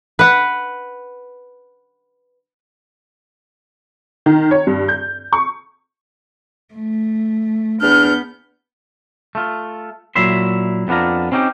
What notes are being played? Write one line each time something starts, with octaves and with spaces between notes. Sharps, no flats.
B4 F#5
D#3
C#5
G2
G6
C#6
A3
E2 B3 D4 F6 G6
A3 F4
A#2 F#3 E4 E5 C6
F2 B3 D4 F4 A#5
C4 C#4 D#4 G4 G5